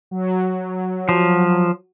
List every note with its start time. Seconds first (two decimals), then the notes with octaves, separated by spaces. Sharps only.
0.11 F#3
1.09 F3